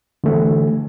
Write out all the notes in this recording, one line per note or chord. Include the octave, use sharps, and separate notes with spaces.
D3 E3 A3